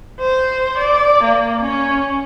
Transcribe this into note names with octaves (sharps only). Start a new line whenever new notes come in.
C5
D5
A#3
C#4